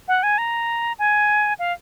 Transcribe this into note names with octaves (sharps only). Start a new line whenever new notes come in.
F#5
G#5
A#5
G#5
F5